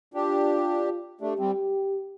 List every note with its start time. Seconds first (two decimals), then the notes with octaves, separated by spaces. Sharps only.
0.14 D4 F4 G4
1.21 A3 D4 G4
1.39 G3 C4